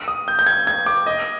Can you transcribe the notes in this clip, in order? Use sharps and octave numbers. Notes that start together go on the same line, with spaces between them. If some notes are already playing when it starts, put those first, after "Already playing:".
D#6
G6
G6
G#6
G#6
D6
D#5